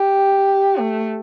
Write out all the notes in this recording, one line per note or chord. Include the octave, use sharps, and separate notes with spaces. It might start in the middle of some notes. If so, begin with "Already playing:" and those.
Already playing: G4
A3